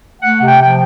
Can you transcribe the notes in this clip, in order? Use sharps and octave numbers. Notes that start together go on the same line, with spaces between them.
A3 F#5
C3
G5
F3 G5